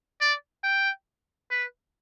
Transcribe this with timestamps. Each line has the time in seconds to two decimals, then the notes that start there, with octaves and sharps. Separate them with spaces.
0.21 D5
0.64 G5
1.50 B4